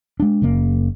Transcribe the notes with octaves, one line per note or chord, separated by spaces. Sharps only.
G#3 D4
F#1 C#3 A#3